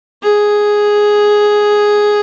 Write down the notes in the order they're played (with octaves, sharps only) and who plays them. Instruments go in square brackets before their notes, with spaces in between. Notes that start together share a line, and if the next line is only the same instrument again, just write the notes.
[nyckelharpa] G#4